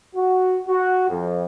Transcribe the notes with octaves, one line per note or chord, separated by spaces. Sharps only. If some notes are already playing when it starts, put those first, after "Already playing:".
F#4
F#4
F2